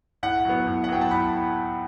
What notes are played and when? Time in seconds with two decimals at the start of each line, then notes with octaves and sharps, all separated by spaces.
0.23 A2 F#5
0.45 F#3 B3
0.67 A2
0.84 F#5
0.89 F#3 B3 G5
1.01 A5
1.11 A2 B5